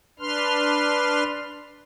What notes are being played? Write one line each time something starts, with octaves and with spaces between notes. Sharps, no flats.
D4 B4 C6 F6